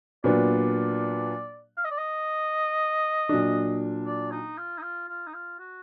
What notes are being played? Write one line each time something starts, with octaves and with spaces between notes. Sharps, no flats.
A#2 F#3 B3 D4 D5
F5
D#5
D5
D#5
A#2 F#3 D4
D5
D#4
F4
D#4
F4
F4
D#4
F4
F#4